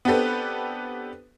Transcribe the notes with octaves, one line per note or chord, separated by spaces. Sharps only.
B3 C4 D4 G4 A4 B4